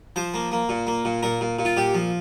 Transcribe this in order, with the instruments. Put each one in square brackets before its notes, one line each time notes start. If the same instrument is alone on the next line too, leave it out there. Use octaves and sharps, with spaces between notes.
[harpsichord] F3 C5
A#3
A#3
A#2
A#3
A#2
A#2 A#4
A#2
A#2
F4
A#2 G4
F3